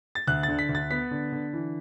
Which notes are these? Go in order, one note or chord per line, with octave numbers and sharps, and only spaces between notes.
A6
D2 F#6
A6
D3
B6
D2
A6
B3 B6
D3
D3
E3